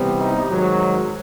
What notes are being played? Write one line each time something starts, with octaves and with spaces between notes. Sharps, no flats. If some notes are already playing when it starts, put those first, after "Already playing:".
Already playing: C3 E3 G3 B3
D#4
G#2 D#3 F#3